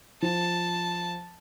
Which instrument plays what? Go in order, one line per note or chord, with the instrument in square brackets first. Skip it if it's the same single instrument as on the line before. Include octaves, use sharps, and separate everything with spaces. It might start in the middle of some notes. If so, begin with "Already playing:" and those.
[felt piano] F3 [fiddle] A5